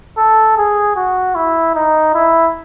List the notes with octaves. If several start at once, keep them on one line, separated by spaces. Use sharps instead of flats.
A4
G#4
F#4
E4
D#4
E4